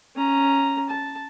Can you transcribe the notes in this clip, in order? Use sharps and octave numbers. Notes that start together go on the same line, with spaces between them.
C#4 A#5
A5